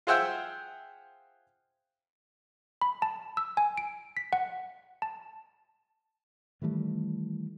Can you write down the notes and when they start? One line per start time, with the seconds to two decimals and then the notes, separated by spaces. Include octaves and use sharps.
0.07 F4 G#4 C5 E5 F#5 G5
2.82 B5
3.02 A5
3.37 E6
3.57 G#5
3.77 D7
4.17 B6
4.33 F#5
5.02 A5
6.62 D#3 E3 G3 A3